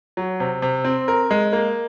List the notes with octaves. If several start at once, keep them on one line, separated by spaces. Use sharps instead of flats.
F#3
C3
C3
C4
A#4
G#3
A#3